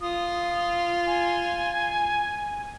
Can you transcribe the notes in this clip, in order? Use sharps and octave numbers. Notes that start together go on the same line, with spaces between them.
F4 D#6
G#5